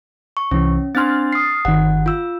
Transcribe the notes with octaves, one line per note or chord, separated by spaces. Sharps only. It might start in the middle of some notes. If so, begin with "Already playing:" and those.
C#6
C2 E3 C#4
C4 D4 C6 F6 A6
D#6 C7
G1 D#3 F#5
F4 E6